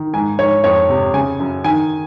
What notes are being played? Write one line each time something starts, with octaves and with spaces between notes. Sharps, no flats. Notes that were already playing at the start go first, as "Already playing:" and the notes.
Already playing: D#3
G#2 G#5
G#2 C#5
F2 C#5
C3
C#3 G#5
F#2
D#3 G#5